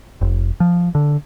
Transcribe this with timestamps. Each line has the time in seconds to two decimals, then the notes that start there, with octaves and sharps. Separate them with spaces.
0.21 F1
0.60 F3
0.95 D3